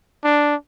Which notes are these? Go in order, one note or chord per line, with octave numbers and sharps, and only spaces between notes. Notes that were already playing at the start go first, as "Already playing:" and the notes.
D4